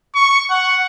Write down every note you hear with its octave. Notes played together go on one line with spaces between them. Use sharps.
C#6
F#5